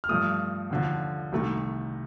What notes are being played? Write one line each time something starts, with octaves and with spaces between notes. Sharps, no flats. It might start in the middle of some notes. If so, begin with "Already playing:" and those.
F6
G2 F3 A3 D#6
D#2 D3 F3
C2 C3 D#3 A3